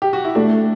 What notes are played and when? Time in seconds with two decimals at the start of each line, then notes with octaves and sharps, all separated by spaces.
0.02 G4
0.13 F#4
0.25 E4
0.35 A3 D4